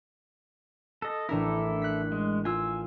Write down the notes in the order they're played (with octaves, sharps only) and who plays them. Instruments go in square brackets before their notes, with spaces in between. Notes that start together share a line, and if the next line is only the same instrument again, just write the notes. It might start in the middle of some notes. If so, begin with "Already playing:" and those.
[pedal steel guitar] A4 D#5
[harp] A1 D4 A#4 [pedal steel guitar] E4 A4
[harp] F#6 B6
[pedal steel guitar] G#3
[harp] F4 [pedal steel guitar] G#5 E6